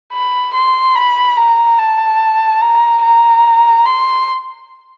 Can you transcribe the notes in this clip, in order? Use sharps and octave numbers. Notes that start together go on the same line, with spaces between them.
B5
C6
B5
A#5
A5
A#5
A#5
C6